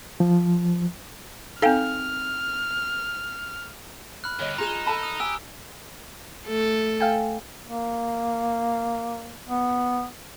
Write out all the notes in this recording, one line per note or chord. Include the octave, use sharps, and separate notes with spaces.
F3
C4 D#4 A4 F5 G5 F6
B5 F6 F#6
G2 D3 C#5 D#5
D#4 F4 G#4 A#5 E7
A4 A5 B5
D#6
G4 G#5 E6
A3 A4
F5 G5 G#5
A#3
B3